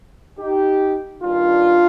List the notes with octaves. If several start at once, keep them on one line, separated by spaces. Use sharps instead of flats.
D#4 G4
G2 D#3 D4 F4